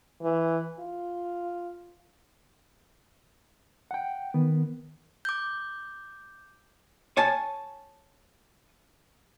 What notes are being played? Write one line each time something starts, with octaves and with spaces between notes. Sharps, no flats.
E3
F4
F#5 G5
D#3 B3
D6 G6
C#5 G#5 A5